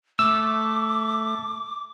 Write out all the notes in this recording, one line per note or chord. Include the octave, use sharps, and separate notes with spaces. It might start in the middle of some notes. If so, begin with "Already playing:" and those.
A3 D6 E6